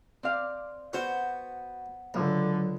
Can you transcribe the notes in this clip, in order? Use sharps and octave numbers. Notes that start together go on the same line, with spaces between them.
C4 D5 F5
B3 F#4 C5
C#2 D3 F#3